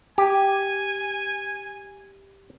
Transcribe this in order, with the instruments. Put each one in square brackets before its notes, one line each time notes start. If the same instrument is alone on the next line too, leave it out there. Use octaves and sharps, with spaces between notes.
[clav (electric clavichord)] G4 [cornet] G#5